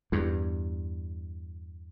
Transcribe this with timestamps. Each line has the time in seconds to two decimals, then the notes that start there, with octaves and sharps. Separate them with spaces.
0.12 E2 G2